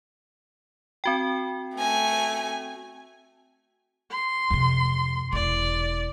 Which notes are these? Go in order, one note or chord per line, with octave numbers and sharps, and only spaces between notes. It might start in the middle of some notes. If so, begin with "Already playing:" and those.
C4 F#4 G5
A3 G#5
C6
F2 C3
E1 E4 D5